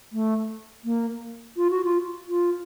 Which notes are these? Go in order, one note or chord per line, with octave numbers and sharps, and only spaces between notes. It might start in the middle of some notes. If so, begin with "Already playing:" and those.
A3
A#3
F4
F#4
F4
F4